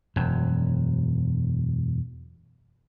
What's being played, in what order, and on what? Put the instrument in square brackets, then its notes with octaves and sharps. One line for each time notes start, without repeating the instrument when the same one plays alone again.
[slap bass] E1 F#2